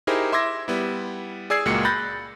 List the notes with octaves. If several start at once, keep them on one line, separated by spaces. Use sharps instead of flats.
D#4 E4 G4 G#4 A#4 C5
E5 C6 D6 E6 G#6 A#6
G3 B3 E4
G#4 D5 E6 G#6 C7
C#2 A#2 G#3 A#3 F#4 C#7
B5 F#6 G6 A6 A#6